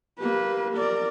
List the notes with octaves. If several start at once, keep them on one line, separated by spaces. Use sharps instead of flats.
A#3 G4 B4
A#4 D5